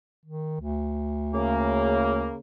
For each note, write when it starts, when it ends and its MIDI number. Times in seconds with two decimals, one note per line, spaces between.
0.26 0.58 51
0.61 2.30 38
1.34 2.36 49
1.34 2.36 58